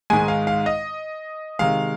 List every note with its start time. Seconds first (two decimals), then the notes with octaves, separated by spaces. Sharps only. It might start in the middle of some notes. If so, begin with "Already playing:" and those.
0.10 G#2 D#3 G#3 G#5
0.28 F5
0.47 F5
0.66 D#5
1.59 C3 D#3 G#3 F5